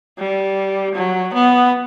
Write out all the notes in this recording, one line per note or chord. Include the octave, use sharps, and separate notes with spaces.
G3
F#3
B3